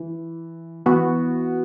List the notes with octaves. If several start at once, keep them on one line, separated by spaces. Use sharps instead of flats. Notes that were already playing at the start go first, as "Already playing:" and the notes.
Already playing: E3
E3 B3 F#4